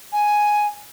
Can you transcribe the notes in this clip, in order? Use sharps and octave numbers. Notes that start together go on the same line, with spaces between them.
G#5